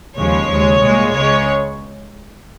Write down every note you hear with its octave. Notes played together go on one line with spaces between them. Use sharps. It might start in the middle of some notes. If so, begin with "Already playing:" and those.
D#2 C#3 F3 G#3 C#5
D#2 C#3 G#3
C2 A#2 G#3
C#2 C#3 G#3 C#5